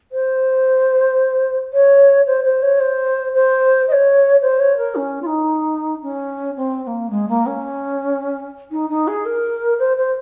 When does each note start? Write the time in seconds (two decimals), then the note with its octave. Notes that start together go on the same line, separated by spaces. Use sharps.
0.12 C5
1.73 C#5
2.26 C5
2.44 C5
2.62 C#5
2.80 C5
3.34 C5
3.88 D#5
3.92 C#5
4.42 C5
4.59 C#5
4.77 A#4
4.95 C#4
5.22 F4
5.26 D#4
6.02 C#4
6.57 C4
6.83 C4
6.87 A#3
7.10 G#3
7.28 A#3
7.46 C#4
8.71 D#4
8.90 D#4
9.07 G#4
9.25 A#4
9.79 C5
9.97 C5